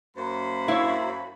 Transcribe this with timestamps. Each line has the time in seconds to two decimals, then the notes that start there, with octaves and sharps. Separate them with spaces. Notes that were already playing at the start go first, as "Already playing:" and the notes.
0.17 F#2 A#3 C5 B5
0.68 E4 C#5 F5